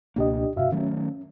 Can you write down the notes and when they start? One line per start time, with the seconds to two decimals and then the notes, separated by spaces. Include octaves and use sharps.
0.16 C#2 B2 A#3 D4 G4 D#5
0.56 G2 C3 F#4 E5 F5
0.72 D#3 F#3 A3 C#4